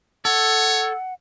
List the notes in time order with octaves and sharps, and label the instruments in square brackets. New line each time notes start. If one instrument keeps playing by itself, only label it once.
[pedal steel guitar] A4 [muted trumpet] C#5 [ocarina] F#5